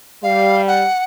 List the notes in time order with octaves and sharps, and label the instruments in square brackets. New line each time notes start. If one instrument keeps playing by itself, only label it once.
[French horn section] G3 [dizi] F5
[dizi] F#5